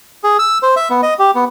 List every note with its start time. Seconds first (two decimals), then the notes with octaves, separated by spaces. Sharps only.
0.24 G#4
0.39 E6
0.63 C5
0.76 E5
0.90 B3
1.03 D#5
1.19 G4
1.35 B3